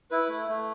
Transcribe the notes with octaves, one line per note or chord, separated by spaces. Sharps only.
E4 B4
A3
A3